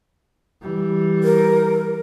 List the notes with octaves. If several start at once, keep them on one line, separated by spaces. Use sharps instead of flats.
E3 G3
A#4